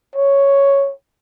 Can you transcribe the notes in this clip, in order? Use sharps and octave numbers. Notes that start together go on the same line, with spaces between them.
C#5